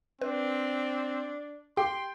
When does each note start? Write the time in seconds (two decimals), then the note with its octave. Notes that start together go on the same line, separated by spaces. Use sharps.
0.21 C4 D4 B4
1.77 G4 G5 C6